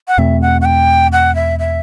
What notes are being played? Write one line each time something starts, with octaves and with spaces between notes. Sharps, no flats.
F#5
E2 B2 A3 C4 E5
F#5
F#5
G5
F#5
E5
E5